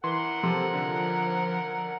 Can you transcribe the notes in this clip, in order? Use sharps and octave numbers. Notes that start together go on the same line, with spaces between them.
E3 A#4 F#5 C6
C3 F3 A4
D3